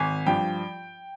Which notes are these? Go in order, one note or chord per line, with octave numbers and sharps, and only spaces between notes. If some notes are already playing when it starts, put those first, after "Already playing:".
Already playing: G#1 G#5
G2 F3 G5